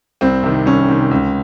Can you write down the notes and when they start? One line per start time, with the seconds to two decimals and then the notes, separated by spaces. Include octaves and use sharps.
0.21 C2 C4
0.43 C3 D#3
0.66 C2 C#4
0.88 C3 D#3
1.11 C#2